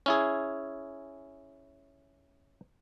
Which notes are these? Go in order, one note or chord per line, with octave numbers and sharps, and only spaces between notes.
C#4 E4 G#4